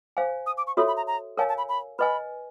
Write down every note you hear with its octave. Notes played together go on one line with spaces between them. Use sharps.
C5 F5 G#5
D#6
D6
C#6
F#4 A4 C#5 E5 B5
B5
A#5
A#5
A#4 C#5 F5 G#5 A5
A5
B5
B5
B4 D#5 G#5 B5